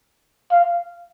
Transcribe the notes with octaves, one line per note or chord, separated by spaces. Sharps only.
F5